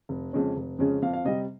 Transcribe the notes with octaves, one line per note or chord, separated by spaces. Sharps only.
F1
F2 C#3 G#3 C#4
F1
F2 C#3 G#3 C#4
F2 F5
F5
C3 G3 D#5